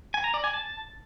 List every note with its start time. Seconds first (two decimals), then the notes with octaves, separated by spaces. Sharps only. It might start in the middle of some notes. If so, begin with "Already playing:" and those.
0.14 G#5
0.24 A#5
0.34 D5
0.44 G#5
0.54 A5